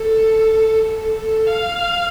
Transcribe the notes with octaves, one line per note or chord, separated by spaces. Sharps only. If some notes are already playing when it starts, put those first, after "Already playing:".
Already playing: A4
A4
A4
F5